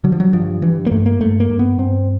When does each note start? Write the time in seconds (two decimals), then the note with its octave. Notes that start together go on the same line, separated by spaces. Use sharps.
0.04 D3 F#3
0.12 F3
0.20 F#3
0.33 G2 F3
0.62 G2 E3
0.86 A#3
0.91 G2 A3
1.06 A#3
1.20 G2 A3
1.40 A#3
1.50 G2
1.59 B3
1.79 G2 C4